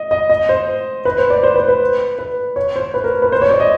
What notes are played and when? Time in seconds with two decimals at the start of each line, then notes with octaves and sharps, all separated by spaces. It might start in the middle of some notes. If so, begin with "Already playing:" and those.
Already playing: D#5
0.11 D#5
0.30 D#5
0.49 C5
1.05 B4
1.18 C5
1.30 D5
1.43 C5
1.56 B4
1.68 B4
2.19 B4
2.56 C#5
2.76 C5
2.94 B4
3.04 A#4
3.22 B4
3.32 C5
3.42 C#5
3.50 D5
3.60 D#5